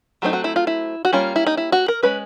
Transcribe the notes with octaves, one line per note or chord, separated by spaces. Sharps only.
F#3 A3 C4 D#4
F#4
E4
F4
E4
F#4
G3 A#3 C#4 F4
E4
D#4
E4
F#4
A#4
G#3 C#4 B4